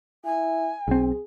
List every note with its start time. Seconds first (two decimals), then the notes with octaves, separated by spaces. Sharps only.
0.25 E4 G#5
0.88 B1 C4 G#4